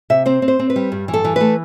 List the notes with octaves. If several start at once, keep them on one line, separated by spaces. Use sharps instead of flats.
C3 E5
C4 C5
C4
C5
C4
B4
G3
G2
E3
A4
E3
A3 B4